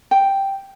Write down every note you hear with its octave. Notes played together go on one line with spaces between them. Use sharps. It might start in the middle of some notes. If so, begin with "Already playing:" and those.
G5